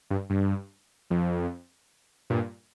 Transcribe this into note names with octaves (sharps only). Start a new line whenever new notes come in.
G2
G2
F2
G2 A#2